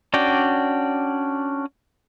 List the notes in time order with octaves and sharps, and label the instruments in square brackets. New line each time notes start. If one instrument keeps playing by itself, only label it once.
[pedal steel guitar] C#4 D4 F#4 D5 G5